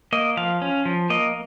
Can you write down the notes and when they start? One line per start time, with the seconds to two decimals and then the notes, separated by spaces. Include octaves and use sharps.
0.13 A#3 D#5
0.37 F3 F5
0.62 C#4
0.85 F3
1.10 A#3 D#5